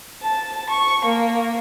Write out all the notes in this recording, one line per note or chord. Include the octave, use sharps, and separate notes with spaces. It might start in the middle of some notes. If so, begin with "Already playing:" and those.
A5
C#6
A#3